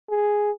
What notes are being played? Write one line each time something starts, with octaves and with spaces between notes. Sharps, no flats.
G#4